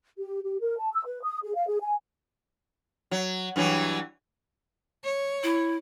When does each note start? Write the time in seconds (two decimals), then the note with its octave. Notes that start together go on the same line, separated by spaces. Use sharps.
0.18 G4
0.43 G4
0.61 A#4
0.78 A5
0.93 E6
1.06 B4
1.23 D#6
1.44 G#4
1.55 F5
1.67 G#4
1.82 G#5
3.11 F#3
3.56 G2 E3 F#3
5.04 C#5
5.43 E4